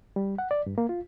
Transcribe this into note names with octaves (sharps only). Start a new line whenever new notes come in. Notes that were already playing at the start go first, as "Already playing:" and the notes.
G3
F#5
D5
G2
A#3
F4